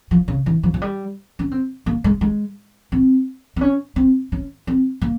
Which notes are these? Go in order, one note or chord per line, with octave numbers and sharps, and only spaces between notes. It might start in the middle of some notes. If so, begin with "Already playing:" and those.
F3
C#3
E3
F3
F3
G3
C#4
C4
A#3
G#3
G#3
C4
C4
C#4
C4
C#4
C4
A#3